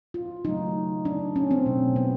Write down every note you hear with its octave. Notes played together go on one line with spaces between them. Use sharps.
F4
C#3 F#3 A3 D#4
D4
C#4
C4
B2 F#3 A3
B3